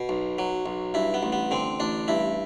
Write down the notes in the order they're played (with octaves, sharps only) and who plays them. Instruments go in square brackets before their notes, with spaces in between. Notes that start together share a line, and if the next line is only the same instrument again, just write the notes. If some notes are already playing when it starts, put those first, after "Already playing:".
Already playing: [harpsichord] B2
B1
F#3
B1
G2 E4
B3
A1
B3
D3 C4
A1 D4
G2 E4